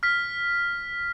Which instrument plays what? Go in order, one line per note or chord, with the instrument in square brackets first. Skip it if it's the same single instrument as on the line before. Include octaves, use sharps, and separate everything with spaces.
[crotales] F6 B6